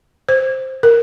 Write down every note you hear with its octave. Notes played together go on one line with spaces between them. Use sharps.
C5
A#4